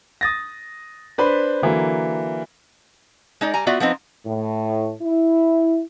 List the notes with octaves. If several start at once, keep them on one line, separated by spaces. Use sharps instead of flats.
D#6 A6 A#6
D4 B4 C5 B5
D3 E3 F#3 A#3
G#3 D#4 D5
G3 G#5 A#5
B3 F4 F#4 D5 E5
F3 B3 C4 D#4
A2
E4